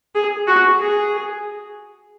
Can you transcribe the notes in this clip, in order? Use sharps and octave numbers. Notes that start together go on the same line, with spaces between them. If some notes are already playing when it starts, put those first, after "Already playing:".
G#4
F#4
G#4